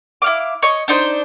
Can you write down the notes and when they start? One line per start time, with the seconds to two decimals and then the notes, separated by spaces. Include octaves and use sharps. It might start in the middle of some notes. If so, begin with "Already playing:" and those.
0.22 E4 F5 D6
0.62 C#5 D#5
0.88 D4 D#4 C5